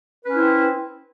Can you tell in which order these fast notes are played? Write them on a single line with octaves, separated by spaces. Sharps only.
B4 C#4 E4 C4